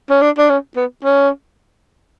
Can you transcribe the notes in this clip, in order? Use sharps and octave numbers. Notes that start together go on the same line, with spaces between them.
C#4
D4
D4
C#4
B3
C#4